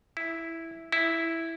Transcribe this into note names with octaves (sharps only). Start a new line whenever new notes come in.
E4
E4